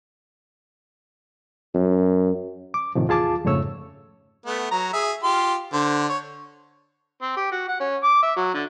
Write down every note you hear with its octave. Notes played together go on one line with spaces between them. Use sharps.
F#2
D6
A2 C3 D#3 F3
E2 F4 G#4 A5 D6
F2 G#2 C#3 A3 C#5 E6
A3 B3
F#3 A#5
G#4 E5
F4 G4 C6
D3 C5
C#5
C4
G4
F#4
F#5
C#4
D6
E5
F#3
D3